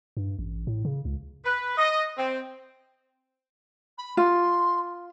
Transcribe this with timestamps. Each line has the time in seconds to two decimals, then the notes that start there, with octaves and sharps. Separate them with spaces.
0.17 G2
0.39 A1
0.67 A2
0.85 C#3
1.05 C#2
1.45 B4
1.78 D#5
2.18 C4
3.98 B5
4.17 F4 C6